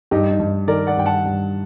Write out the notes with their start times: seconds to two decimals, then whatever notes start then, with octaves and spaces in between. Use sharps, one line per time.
0.11 G2 D#4 G4
0.31 D#4
0.40 G2
0.68 D#3 A#4 D5
0.87 D5 F#5
0.97 G2 G5
1.06 F#5 A5
1.25 G2